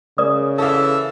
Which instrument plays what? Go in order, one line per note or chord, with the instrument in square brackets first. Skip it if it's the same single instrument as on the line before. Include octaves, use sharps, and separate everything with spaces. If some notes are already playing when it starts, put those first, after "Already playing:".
[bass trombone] C#3 [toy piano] A#4 D5 D#6
[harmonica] E3 E5 [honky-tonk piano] A4 F5